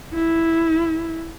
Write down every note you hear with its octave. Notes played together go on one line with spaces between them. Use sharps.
E4